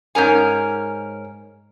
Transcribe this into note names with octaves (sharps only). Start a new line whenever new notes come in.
G#2 C#4 A#4 G#5